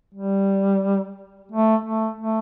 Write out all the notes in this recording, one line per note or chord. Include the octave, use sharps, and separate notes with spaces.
G3
A3
A3
A3